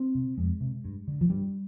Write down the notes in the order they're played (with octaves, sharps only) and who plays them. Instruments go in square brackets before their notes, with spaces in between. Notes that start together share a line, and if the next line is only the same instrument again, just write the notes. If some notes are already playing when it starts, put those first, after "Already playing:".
Already playing: [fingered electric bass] C4
C3
F2 G#3
C3
G2
D3
F3
G2 G3